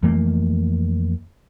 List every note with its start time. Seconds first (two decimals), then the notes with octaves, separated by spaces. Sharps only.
0.03 F2 E3 A3 A#3